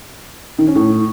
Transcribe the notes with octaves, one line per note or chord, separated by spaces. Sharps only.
D#3
C#4
A2